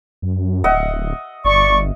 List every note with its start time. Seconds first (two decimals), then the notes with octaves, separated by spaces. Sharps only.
0.22 F#2
0.64 D1 D#5 E5 F#5
1.45 G1 D5 C#6